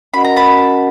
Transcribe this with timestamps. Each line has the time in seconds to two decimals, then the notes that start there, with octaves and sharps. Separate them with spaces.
0.14 C#4 F#4 A#4 D#5 F#5 B5
0.24 A#5
0.36 A5 B5